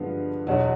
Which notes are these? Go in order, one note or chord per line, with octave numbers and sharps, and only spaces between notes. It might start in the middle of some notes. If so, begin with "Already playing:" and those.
Already playing: G2 D3 F3 G#3 B3
E2 B2 F#3